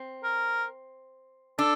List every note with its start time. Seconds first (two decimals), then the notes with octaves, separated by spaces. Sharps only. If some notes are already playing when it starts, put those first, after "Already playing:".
Already playing: C4
0.24 A#4
1.59 D4 A4